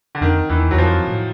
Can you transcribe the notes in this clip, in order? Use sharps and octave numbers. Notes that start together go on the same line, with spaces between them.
D3
F2 D#3
E2 E3
E2 F#3
F2 F3
A2